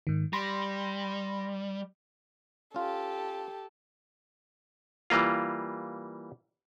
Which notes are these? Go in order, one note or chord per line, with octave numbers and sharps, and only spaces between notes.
G#2 D#3
G3 B5 C6 A#6
C#4 F4 G4 A4
E3 G3 A#3 F4